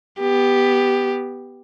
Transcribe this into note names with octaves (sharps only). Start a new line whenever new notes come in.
B3 G4